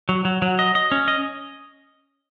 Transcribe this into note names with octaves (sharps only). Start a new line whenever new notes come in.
F#3
F#3
F#3
D#5
D#5
C#4
D#5